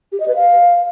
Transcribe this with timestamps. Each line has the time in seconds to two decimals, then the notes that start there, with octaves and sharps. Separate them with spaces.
0.12 G4
0.20 D#5
0.28 B4
0.36 F5